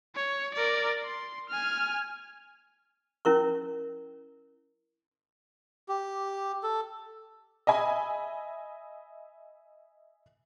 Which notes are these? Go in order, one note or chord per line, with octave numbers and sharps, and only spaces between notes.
C#5
A#4 D5
C6
G#5 F6
C#4 E4 A#4 C#6
G4
A4
D#5 E5 G#5 B5